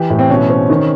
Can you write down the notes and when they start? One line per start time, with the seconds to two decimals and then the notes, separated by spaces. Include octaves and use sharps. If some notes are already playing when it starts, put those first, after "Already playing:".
Already playing: E3 G4
0.10 A2
0.19 C4
0.30 B2 C#4
0.50 C4
0.70 D#3